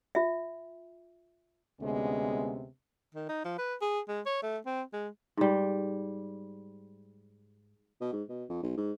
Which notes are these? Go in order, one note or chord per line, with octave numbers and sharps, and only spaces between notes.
F4 E5
D2 C3 G#3 B3 C#4
D#3
D#4
F3
B4
G#4
G#3
C#5
A3
C4
G#3
G#2 G3
B2
G#2
B2
F2
B1
G#2